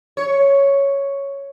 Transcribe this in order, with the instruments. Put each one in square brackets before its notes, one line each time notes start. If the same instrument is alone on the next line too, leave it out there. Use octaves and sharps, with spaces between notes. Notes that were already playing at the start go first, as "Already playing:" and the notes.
[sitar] C#5